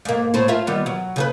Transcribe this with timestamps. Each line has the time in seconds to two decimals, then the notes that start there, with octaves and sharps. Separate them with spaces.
0.05 G#2 A#3
0.34 A2 C5
0.48 F4 A#4 E5
0.67 D#3 G3 B3
0.86 F#3
1.16 C#3 G#4 B4